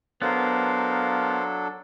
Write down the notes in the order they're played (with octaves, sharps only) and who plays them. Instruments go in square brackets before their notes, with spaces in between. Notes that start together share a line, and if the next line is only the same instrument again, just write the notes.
[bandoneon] F#3 D4 A4 [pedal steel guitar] B3 [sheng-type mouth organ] A#4 C5 F5